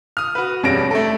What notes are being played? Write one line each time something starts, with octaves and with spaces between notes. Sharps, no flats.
D#6 F6
F#4 B4
E1 G2 G3 C#4 A#6 D7
A3 A4